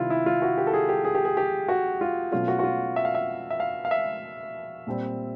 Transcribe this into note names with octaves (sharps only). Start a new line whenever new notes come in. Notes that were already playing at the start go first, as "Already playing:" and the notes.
Already playing: C3 D#3 G3 E4 F4
E4
F4
F#4
G4
A4
G#4
G4
G#4
G4
G#4
G4
F#4
F4
B2 F#3 A3 C#4 F4
F#4
F#4
F4
E5
F5
E5
E5
F5
F5
E5
A#2 G3 C4